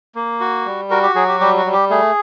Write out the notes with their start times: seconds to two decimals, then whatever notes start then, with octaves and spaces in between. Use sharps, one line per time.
0.15 A#3
0.40 F#4
0.65 G3
0.90 F#4 A#4
1.03 G4
1.15 F#3 G#4
1.28 G4
1.40 G3 G4
1.57 F#4
1.66 G3
1.73 G4
1.90 A3 G#4